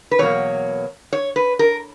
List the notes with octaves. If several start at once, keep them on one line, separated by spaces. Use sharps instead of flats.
B4
E2 B2 F#3 A#3 C#5
C#5
B4
A#4